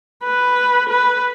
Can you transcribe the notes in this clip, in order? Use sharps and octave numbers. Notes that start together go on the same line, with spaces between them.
B4
B4